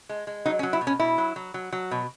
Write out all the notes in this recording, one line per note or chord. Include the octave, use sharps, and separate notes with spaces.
G#3
G#3
F#3 D#4
C#4
F#3
E4
B2
C#4
B2 E4
F#3
F#3
F#3
F#3
B2